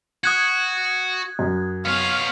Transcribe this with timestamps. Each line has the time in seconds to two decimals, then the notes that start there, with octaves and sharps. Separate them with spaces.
0.24 F#4 D#6 F#6 G#6
1.39 F#2
1.85 B3 C#5 F5